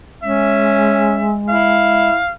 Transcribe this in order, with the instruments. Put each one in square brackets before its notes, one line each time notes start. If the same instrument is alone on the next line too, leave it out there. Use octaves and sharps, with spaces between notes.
[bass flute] G#3 [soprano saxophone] C#4 [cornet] E5
[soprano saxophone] E4 [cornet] F5